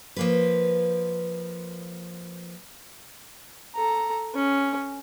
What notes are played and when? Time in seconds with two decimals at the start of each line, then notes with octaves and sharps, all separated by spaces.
0.16 F3 A#3 B4
3.75 A4 A#5
4.34 C#4